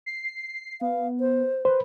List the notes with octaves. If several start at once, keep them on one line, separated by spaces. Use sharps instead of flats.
C7
B3 F5
C5
B4 C5